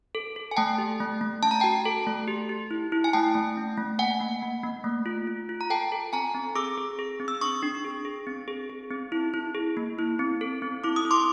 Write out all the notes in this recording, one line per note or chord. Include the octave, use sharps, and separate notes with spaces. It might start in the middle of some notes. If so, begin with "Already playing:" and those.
A4
A4
G#5
A3 G5 A5
G4
A3
A3
C#4 A5
A#5
F#4 G5 A5
A4
A3
G4
G4
E4
E4
G#5
A3 G5 A5
A3
C#4
A3
A#3 F#5 G#5
A#3
A#3
A#3
A3
F4
F4
F4
A#5
A4 G5 A5
A4
C4 G#5 A#5
C4
G#4 D6 E6
G#4
G#4
C4
E6
D4 C#6 D#6
D4
G#4
G#4
C4
G#4
G#4
C4
E4
E4
G#4
A#3
E4
C4
A4
C4
E4 D6
D#6
E4
C6 D6